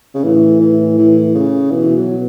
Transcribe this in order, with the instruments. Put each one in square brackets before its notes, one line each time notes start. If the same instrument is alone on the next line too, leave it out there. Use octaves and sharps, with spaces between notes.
[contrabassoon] C#3
[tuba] A2 [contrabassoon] E3
[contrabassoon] E3
E3
C#3
[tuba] B2 [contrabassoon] E3
[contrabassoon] F#3